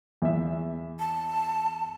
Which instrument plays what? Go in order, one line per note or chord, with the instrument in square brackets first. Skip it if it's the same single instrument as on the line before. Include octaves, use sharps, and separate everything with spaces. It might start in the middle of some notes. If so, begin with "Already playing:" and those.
[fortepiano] E2 E5
[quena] A5